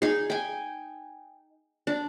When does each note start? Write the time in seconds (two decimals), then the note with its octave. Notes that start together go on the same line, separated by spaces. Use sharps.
0.02 D#4 G#4
0.30 G5 G#5
1.87 D4